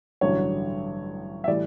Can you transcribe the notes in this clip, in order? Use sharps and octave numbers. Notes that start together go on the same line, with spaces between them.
A1 G2 D3 F#3 C#5
E5
A2 E3 G3 D5